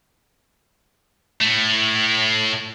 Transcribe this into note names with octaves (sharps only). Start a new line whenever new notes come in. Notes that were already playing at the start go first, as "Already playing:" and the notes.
A2 A3